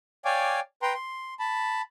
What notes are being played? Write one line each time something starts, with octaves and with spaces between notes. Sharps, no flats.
C#5 D5 F5 G5 G#5 D6
B4 G5 A#5 C6
C6
A5 B5